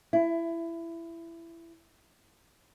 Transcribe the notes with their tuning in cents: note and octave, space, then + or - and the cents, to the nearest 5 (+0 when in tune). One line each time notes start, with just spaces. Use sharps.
E4 +20